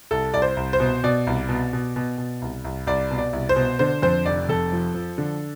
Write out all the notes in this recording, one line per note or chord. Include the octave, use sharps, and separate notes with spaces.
C2 A4
C2 D5
C5
C2
C5
B2
B2 D5
C2
B2
B2
B2
B2
C2
C2
C2 D5
B2
D5
C2
C5
B2
D3 C5
F2 C5
F1 D5
F2 A4
F3
F3
D3